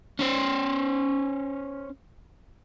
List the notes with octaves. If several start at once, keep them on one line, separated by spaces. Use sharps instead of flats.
C#4 C5